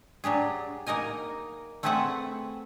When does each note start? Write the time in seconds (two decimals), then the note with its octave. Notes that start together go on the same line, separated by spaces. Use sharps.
0.24 F#3 D4 G4 G#4
0.87 A#3 D#4 A#4 D#5 G#5
1.83 A3 C4 G#4 B4 E5 F#5